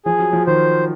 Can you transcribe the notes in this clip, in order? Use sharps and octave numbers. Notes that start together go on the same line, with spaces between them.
F3 G#4
F#3
F3
D#3 C5